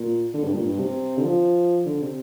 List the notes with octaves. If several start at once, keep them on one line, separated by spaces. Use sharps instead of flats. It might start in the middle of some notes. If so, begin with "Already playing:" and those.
Already playing: A#2
D3
G2
A#2
G2
C3
D3
F3
D3
C3